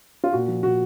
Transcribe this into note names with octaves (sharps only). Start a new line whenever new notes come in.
F4
A#2 F#4
F3
A#2 F#4